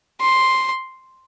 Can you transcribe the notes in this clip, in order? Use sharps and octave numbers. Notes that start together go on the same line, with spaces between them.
C6